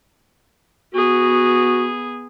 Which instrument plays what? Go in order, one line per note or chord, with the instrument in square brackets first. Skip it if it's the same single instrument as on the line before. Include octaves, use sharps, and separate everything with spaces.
[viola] B3 G#4 [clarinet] F#4